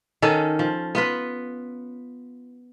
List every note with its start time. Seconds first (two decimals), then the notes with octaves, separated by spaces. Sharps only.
0.22 D#3 C#4 A4
0.59 F3
0.95 B3 F4 B4